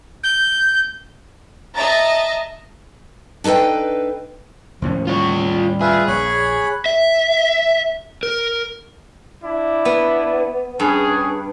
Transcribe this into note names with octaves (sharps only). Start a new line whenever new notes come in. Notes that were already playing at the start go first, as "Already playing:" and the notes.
G6
D#5 E5 A5 A#5 A6
D4 D#4 A4 B4 G5
D#2 A2 F3 C#4
G3 F4 C#5
F4 G#4 B4 E5
A#1 C#5 B5 F#6
E5
A#4
D4 E4 D5
B3
G2 C#4 G#4